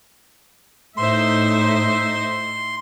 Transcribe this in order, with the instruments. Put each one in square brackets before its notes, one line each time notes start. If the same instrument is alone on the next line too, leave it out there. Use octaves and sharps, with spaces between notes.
[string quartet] A2 [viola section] D#4 C5 E5 [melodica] C6